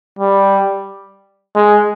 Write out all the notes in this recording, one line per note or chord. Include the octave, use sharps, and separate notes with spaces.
G3
G#3